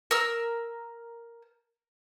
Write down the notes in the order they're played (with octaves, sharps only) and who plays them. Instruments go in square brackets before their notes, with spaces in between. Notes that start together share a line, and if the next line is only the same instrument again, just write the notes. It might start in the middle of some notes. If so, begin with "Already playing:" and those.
[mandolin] A#4 E6